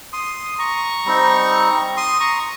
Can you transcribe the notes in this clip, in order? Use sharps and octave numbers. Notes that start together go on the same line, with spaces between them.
C6 D#6
A#5 C#6
G3 C4 D#4
C6 D#6
A#5 C#6